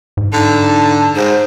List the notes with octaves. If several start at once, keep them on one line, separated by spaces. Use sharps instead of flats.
G#2
D3 D#4 A5
G#2 C5